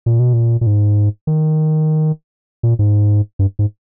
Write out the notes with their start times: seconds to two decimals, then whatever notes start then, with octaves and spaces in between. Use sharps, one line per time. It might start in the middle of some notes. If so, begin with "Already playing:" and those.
0.06 A#2
0.20 B2
0.33 A#2
0.61 A#2
0.67 G#2
1.27 D#3
2.63 A#2
2.79 G#2
3.39 G2
3.59 G#2